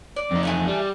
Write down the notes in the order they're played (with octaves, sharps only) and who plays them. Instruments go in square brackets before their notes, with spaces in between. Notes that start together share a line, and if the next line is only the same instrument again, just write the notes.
[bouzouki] D5
[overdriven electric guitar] F2 D#4
[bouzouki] E3 A3 G#4
[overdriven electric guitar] G3